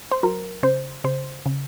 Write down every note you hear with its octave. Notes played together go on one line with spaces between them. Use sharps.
C5
F#3 A#4
C#3 C5
C#3 C5
C#3